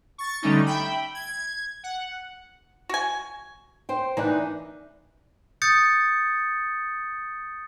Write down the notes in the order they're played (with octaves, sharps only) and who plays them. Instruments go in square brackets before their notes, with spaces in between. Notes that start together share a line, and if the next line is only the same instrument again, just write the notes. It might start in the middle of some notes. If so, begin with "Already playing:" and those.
[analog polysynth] C#6 A6
D3 G3 A3 C#4 D#4
E5 G5 B5
G#6
F#5
[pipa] F#4 G#5
[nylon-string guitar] C5 G5
[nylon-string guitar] E3 D4 D#4 [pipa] A#3
[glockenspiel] D#6 G6 A6 C#7